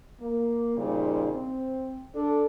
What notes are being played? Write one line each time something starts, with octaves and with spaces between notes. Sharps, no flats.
A#3
A#2 C#3 G3 D#4 C5
C4
D4 A4